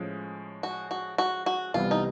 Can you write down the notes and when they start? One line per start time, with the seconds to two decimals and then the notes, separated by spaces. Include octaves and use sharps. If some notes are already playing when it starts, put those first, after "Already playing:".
Already playing: A2 F3 G#3 C#4
0.63 F#4
0.91 F#4
1.18 F#4
1.46 F#4
1.74 C2 C3 E3 G3 B3 F4
1.91 D#4